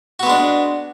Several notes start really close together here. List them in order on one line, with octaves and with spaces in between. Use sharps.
F#4 B3 G#3 D4